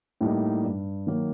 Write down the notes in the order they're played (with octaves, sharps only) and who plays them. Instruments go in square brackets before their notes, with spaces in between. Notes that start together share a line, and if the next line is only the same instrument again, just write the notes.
[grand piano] A2 G3 A#3 D#4
G2
D#3 F#3 A#3